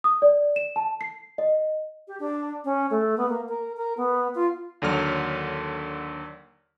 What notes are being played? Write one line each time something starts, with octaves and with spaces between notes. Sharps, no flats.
D#6
D5
E7
A5
C7
D#5
G4
D4
C#4
A3
B3
A#3
A#4
A#4
B3
F4
D#2 D3 F#3 F6